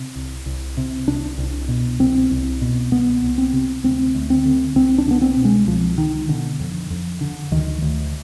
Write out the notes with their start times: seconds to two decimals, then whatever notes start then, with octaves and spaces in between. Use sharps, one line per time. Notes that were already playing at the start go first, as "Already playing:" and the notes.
Already playing: C3
0.16 C2
0.46 C2
0.77 C3
1.07 C2 D4
1.38 C2
1.68 B2
2.00 C2 C4
2.31 C2
2.62 B2
2.91 C2 B3
3.23 C2
3.38 C4
3.53 C3
3.84 D2 C4
4.15 D2
4.30 C4
4.45 D3
4.75 C2 C4
4.98 D4
5.07 C2 B3
5.21 C4
5.37 B2
5.45 G#3
5.67 C2 F3
5.98 C2 D#3
6.29 B2 D3
6.60 F2
6.90 F2
7.21 D3
7.51 D2 D#3
7.82 D2